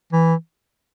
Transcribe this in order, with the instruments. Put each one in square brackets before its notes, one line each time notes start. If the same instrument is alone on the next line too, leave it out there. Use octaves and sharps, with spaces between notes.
[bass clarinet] E3